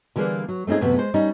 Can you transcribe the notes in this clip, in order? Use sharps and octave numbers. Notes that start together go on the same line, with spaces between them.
D3 E3 G3 A#3 G#4 D5
F#3
A3 C4 C#4 D#4 G#4
F#2 A2 C3 E3 B3
G#3 C5
G3 C#4 D#4